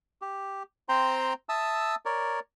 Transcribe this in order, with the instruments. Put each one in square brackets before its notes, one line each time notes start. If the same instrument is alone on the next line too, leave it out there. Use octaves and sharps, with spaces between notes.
[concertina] G4
C4 C5 G5 A#5 C6
E5 A5 D#6 E6
A#4 C#5 D5